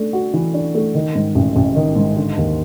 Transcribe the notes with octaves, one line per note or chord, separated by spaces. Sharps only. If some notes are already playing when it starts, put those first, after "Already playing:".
Already playing: A3 D4
F#4
E3
D4
A3
D#3
G#2
A1
A1
D#3
G#2
D3
D#2